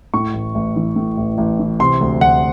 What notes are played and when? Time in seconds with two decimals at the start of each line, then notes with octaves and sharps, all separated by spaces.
0.14 A2 C#6
0.34 A1
0.55 A1
0.76 E3
0.96 A2
1.17 A1
1.38 A1
1.59 E3
1.80 C3 C6
2.01 D2
2.21 D2 F#5